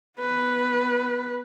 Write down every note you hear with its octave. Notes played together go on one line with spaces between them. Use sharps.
B3 B4